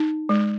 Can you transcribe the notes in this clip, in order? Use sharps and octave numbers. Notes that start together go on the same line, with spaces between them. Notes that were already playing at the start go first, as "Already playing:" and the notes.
Already playing: D#4
G#3